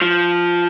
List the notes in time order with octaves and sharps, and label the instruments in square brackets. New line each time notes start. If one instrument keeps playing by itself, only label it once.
[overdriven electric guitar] F3